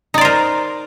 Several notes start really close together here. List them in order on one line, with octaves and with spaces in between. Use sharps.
D#4 D5 C5 A#4